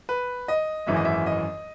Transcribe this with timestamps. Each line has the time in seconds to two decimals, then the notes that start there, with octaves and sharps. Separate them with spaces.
0.09 B4
0.48 D#5
0.87 G#1 F#2 E3 G#3 E5
0.96 D#5
1.05 E5
1.26 D#5